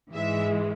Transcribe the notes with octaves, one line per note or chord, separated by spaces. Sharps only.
G#2 E3 G#3 E5